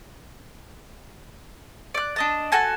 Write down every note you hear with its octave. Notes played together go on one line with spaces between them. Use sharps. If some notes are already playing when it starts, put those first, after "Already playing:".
D5 F#6
D4 D#5 A5
F#4 A4 G#5 A5